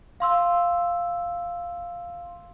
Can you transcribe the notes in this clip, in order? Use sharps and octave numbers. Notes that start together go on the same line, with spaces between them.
F5 C6 E6